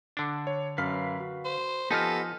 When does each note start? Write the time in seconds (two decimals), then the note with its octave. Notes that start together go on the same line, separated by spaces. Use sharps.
0.17 D3 D4
0.47 C#5
0.78 F#2 B4 F5 F6 B6
1.20 F#4
1.45 C5
1.90 F3 B3 D#4 G4 A4 D#5 G#5 F6